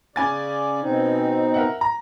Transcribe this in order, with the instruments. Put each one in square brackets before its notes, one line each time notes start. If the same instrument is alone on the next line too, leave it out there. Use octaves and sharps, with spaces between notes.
[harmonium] C#3 D5 [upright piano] C#4 G#5 A6
[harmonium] B2 C4 D#4
[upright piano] A#4 E5 F#5
A#5